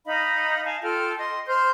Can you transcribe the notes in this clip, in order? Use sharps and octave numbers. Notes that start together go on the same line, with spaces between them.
D#4 D#5 F5 B5
F5 G#5 A5
F4 A4 G5 F6
D#5 C6
C5 C6 F6 G6